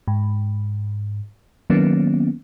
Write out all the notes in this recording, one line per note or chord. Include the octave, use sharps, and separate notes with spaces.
G#2
D#3 F#3 A#3 B3 C#4